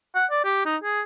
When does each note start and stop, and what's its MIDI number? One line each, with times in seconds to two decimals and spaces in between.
0.15 0.25 78
0.31 0.41 74
0.45 0.62 67
0.66 0.76 63
0.83 1.01 68